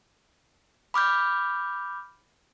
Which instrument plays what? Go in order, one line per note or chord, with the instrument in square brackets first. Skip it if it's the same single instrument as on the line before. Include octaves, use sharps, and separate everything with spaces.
[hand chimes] B5 D6 F6 G6